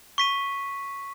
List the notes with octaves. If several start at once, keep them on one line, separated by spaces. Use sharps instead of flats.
C#6 B6 D#7